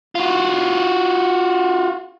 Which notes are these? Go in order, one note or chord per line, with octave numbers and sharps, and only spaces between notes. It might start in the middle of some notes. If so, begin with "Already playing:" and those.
F4 F#4